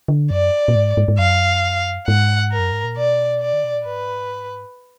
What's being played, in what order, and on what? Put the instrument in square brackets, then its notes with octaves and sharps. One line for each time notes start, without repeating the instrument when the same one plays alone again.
[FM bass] D3
[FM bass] F#2 [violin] D5
[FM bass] A#2
G#2
G#2
G#2
[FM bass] F#2 [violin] F5
[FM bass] G#2 [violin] F#5
[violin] A#4
[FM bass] F#2
G#2
A#2
[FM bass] B2 [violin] D5
[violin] D5
[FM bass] D3
B2
A#2
[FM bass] G#2 [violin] B4